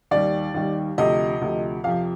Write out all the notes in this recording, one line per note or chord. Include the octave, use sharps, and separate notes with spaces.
D#2 D#3 G3 D5
D#2 D#3 G3
D2 C3 F3 D#5
D2 C3 F3
F2 C3 F3 F5